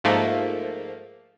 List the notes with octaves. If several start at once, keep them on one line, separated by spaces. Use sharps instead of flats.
G#2 F3 A3 A#3